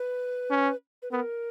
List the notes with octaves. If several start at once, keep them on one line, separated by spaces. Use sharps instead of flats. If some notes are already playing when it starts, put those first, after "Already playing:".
Already playing: B4
C#4
B4
B3 A#4